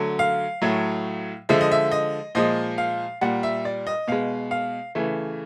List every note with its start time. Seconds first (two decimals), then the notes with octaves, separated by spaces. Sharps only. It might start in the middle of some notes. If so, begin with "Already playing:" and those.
Already playing: D3 F#3 A3
0.19 F5
0.62 A2 F#3 A3
1.49 D3 F3 G#3 E5
1.61 D#5
1.71 E5
1.92 D#5
2.35 A#2 F3 G#3 D#5
2.78 F5
3.21 A#2 G3 F#5
3.43 E5
3.65 D5
3.87 D#5
4.08 B2 G#3 F5
4.51 F5
4.95 C#3 E3 A3